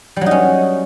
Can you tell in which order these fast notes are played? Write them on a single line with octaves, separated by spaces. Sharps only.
G3 F#3 D#4 C#4